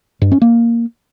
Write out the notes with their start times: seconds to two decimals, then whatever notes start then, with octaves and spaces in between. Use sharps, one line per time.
0.22 G2
0.32 C#4
0.42 A#3